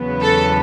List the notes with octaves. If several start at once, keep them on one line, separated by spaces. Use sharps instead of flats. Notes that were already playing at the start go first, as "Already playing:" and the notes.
Already playing: E2 C#3 F#3 B3
A4